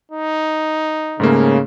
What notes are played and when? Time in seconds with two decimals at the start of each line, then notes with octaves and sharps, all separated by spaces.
0.12 D#4
1.20 G#2 C#3 A3 A#3